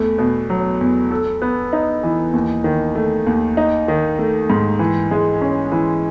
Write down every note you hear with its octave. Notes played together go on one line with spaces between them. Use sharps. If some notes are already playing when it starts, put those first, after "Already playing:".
Already playing: E2 A3
B2
F#3
E2
A4
B3
D#4
E3
D#2
D#3
A3
D#2
D#4
D#3
A3
G#2
E3
G#3
C#4
E3